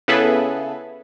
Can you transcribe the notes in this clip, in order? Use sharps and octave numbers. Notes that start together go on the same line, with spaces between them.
C#3 B3 E4 G#4 A4 B4